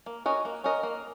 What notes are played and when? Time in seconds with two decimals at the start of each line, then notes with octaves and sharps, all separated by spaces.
0.06 A#3
0.26 C#4 F#4 A#4 D#5
0.45 A#3
0.64 C#4 F#4 A#4 D#5
0.83 A#3